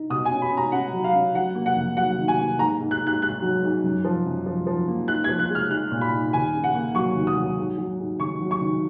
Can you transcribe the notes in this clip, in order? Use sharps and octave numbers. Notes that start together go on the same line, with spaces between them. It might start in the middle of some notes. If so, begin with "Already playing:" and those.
Already playing: D#4
B2 D#6
G#5
C#4
B5
C#4
A#5
C#4 F#5
F#3
F5
C#4
F#3 F#5
A#3
F#5
F2
F#3 F#5
D#3
G#5
A#3
G#2 A#5
G#2
F#6
G#2
F#6
G#2 F#6
F#3
G#2
F#2
F3
F#2
F3
F3
A#3
D#4 F#6
G#6
F3
F#6
G#3 F6
D#4 F#6
A#2
B5
D#4
D#2 G#5
C#3
F#5
A#3
F#3 C#6
D#2
D#6
F#3
G#2
F#3
G#2
D#3 C#6
F#3
C#6
D#3